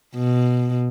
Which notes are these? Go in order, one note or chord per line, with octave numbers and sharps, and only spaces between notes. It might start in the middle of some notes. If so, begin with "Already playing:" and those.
B2